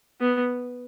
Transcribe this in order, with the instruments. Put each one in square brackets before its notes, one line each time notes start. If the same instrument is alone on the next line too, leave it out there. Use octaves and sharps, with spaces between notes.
[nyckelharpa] B3